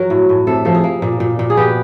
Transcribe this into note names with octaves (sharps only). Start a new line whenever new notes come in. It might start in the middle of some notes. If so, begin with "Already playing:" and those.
Already playing: F#3 A#4
A2
A2
C3 A4
F3 A4
G#4
A#3
A#2
A#2
A#2
G#4
B3 G4